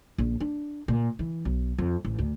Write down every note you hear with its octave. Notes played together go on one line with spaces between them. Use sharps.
A#1
D4
A#2
E3
B1
F2
A1
D2